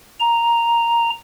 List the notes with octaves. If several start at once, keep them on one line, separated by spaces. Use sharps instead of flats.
A#5